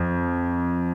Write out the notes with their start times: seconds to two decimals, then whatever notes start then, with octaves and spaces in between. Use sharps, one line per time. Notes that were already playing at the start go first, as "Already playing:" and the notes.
Already playing: F2